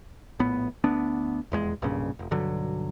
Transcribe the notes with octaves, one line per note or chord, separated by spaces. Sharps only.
A#1 A2 B3
D2 B3 D4
D#1 E2 G#3
B1 G2 A#2 C#3
F1
B1 G2 D3 F#3